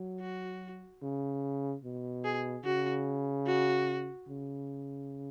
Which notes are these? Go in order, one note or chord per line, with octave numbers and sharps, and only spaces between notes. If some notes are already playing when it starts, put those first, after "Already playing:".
Already playing: F#3
F#4
C#3
B2
G#4
C#3 F#4
F#4
C#3